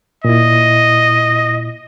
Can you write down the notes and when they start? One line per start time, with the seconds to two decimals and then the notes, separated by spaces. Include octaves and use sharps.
0.25 A#2 E4 D#5